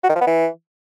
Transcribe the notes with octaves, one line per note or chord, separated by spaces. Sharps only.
F#4
D#3
F3
B3
E3